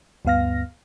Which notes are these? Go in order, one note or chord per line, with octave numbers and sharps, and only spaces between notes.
D2 G2 B3 F5 F6 A#6